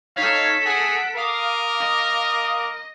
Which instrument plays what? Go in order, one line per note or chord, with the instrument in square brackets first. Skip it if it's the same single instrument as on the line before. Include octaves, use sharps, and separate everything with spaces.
[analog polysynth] D#4 C#5 [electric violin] A4 B6 [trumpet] F5
[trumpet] G#4 [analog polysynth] F#5 D7
[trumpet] A#4 [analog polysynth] F5 D6 D#6
[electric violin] D#5